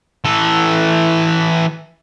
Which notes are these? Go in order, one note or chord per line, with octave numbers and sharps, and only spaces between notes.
E3 A4